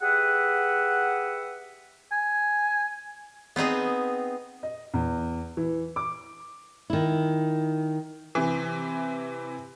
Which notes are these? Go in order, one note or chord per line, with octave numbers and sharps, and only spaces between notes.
G4 G#4 B4 E5 F#5
G#5
B3 C4 D#4 G#4
D#5
E2
E3
D6
D#3 E4
C3 E3